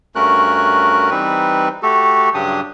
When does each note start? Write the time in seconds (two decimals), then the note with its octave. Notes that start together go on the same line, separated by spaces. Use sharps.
0.15 G2 A3 C#4 F#4 A#4 F#6
1.10 E3 G3 C4 D#4 B4
1.83 A3 F#4 G4 A4
2.34 G2 C#3 F#3 D4 G4 D#6